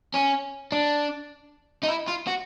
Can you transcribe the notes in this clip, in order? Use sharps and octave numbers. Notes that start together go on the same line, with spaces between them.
C#4
D4
D#4
E4
F4
F#4